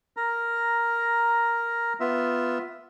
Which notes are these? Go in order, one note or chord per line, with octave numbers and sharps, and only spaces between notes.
A#4 A#5
B3 F4 E5